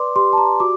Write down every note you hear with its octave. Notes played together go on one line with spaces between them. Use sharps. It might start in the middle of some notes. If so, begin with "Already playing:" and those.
Already playing: B4 D5 C6 D6
G4 C6
A5
A#5
F#4 D6